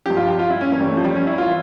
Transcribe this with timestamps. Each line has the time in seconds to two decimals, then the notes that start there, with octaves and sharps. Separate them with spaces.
0.06 G2 F3 G4
0.17 F4
0.28 G4
0.39 F4
0.50 E4
0.61 C#4
0.72 G2 E3 C#4
0.80 G3
0.89 A3
0.97 F3
1.04 G3
1.15 C#4
1.27 E4
1.38 E3 F4